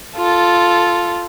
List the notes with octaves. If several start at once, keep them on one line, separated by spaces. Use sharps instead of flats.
F4 A4